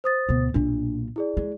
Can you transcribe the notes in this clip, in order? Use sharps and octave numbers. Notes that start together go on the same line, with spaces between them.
C5 D#6 A6
D2 B2
B1 A#2 D4
E4 G#4 D5
G#3